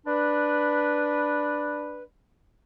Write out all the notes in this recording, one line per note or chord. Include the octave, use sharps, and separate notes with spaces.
D4 B4